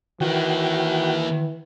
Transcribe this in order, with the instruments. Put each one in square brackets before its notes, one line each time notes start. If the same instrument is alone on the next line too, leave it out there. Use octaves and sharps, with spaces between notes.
[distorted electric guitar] D#3 A#3 [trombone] E3 [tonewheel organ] F#4 G5